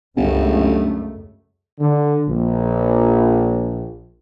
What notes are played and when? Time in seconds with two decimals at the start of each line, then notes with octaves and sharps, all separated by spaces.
0.17 G1 C#2 F#2 A3
1.79 D3
2.28 A#1